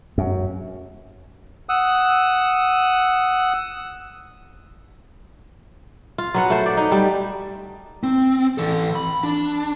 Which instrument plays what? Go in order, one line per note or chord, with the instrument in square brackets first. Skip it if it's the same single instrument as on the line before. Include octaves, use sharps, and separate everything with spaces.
[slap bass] F#2
[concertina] F#5 D#6 E6
[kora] F4
F#3 B3 F#5
A3 C5
D5
D#4
G3
[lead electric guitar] C4
E3 A4
B5
D4